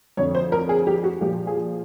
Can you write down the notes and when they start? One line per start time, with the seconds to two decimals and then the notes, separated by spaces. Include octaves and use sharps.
0.17 F2 D3 F3 C#5
0.35 C5
0.52 A#4
0.69 G#4
0.87 G4
1.04 F#4
1.21 A#2 F3 G4
1.47 G#4